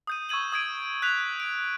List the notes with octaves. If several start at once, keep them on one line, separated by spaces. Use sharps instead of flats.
D#6 G6 D#7
C#6 E6 G#6 D#7 F#7
D#6 G#6 D7 D#7
F#6 B6 F7
D7